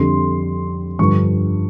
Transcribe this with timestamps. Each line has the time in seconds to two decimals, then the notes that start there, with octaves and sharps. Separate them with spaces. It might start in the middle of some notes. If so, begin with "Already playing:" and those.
Already playing: F2 D3 G3 C6
0.99 G2 D3 F3 C#6